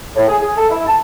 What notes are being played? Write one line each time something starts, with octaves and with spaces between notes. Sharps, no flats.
A2
G#4
G#4
A4
E4
A5